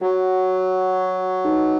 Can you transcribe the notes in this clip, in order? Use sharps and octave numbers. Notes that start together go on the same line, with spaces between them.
F#3 F#4 C#5 F#5
D#4 G#4 B4 D#5